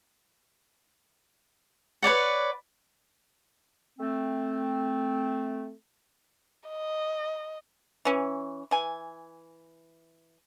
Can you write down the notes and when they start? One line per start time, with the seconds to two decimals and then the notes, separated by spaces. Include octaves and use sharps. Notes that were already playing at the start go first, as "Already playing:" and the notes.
2.03 B4 C#5 D5 F#5
3.99 A3 C4
6.68 D#5
8.05 E3 C#4
8.71 E3 G#5